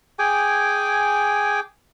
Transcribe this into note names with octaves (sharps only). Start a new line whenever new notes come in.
G#4 G5 G#5 D6